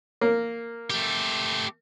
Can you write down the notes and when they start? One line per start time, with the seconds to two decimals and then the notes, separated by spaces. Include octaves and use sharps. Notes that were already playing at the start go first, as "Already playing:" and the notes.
0.21 A#3
0.90 A3 G4